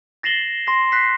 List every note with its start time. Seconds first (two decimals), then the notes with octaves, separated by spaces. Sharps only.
0.23 A6 A#6 C7 E7 F#7 G7
0.67 C6 A#6 C7
0.92 F#6 B6 C7